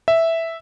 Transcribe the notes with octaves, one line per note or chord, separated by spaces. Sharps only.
E5